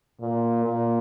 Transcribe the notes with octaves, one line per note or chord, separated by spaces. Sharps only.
A#2
A#2